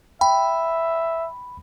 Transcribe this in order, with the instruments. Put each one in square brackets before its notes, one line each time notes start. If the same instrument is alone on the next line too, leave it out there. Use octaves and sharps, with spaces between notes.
[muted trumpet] E5 [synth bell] G5 [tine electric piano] B5